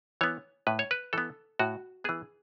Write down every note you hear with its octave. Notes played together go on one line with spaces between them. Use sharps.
E3 B3 C#5
A2 B4
C#5
B4
E3 B3 A4
A2 F#4
E3 B3 G#4